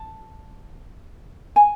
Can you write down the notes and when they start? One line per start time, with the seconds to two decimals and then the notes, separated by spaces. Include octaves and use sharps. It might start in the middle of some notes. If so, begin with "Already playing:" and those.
Already playing: A5
1.56 G#5